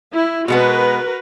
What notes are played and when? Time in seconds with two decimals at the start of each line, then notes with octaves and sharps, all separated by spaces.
0.11 E4
0.48 B2 G#3 B3 F#4 A#4 B4